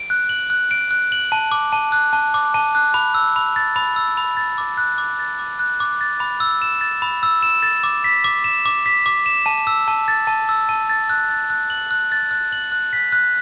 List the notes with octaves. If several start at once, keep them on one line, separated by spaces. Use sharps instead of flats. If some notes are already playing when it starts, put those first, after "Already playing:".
Already playing: D7
F#6
F#7
F#6
D7
F#6
F#7
A5
D6
A5
F#6
A5
D6
A5
F#6
B5
E6
B5
A6
B5
E6
B5
A6
D6
F#6
D6
A6
D6
F#6
D6
A6
B5
E6
E7
A6
B5
E6
E7
A6
D6
B6
D6
E7
D6
B6
D6
E7
A5
E6
A5
A6
A5
E6
A5
A6
F#6
A6
F#6
F#7
F#6
A6
F#6
F#7
F#6
B6
F#6